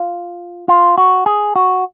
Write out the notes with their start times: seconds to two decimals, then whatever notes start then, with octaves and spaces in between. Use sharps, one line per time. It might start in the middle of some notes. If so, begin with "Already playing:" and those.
Already playing: F4
0.68 F4
0.98 F#4
1.26 G#4
1.56 F#4